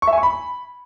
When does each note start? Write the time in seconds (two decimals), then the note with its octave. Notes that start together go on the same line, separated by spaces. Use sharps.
0.02 C#6
0.07 E5
0.13 G#5
0.18 C#6
0.23 B5